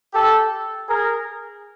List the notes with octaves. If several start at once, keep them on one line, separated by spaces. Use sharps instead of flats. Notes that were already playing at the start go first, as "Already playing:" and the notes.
G4 A4
G#4 A#4